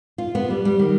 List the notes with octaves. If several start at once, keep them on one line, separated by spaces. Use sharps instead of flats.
F4
B3
G3
G3
D#3